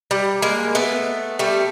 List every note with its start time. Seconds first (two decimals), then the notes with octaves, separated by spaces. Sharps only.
0.11 G3
0.42 G#3 A#3
0.75 A3 B3
1.39 G3 A3